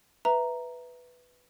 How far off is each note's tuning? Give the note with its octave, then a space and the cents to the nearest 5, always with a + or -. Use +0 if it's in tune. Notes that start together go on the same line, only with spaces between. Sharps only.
B4 +0 E5 +0 A#5 +0